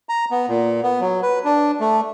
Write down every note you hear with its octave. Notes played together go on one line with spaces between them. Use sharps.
A#5
B3
A#2
B3
F#3
B4
D4
A3